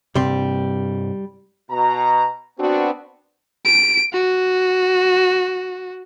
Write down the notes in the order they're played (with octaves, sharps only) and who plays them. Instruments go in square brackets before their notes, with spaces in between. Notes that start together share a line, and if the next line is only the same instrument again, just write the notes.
[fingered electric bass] G2 C3 C4 [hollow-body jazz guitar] G3 C6
[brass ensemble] B2 A#5
B3 C4 D4 F#4
[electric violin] D7
F#4